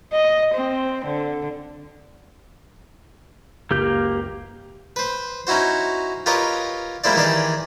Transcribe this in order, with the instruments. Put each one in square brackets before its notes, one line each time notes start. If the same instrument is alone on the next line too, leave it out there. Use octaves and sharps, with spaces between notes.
[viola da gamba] D#5
C4
D3
[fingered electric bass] F#1 C#2 [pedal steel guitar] A#3 G4 G6
[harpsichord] B4 C5
C#4 D#4 E4 F#4 C5
F4 G4 A#4 B4 C#5 D#5
G3 G#3 A#3 E4 C5 D5
D#3 E3 G4 G#4 D5